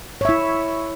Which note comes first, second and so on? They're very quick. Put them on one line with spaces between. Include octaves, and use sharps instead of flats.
C#5 E5 E4